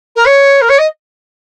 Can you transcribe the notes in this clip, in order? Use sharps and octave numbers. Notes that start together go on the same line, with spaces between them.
A#4
C#5
A#4
C#5
D#5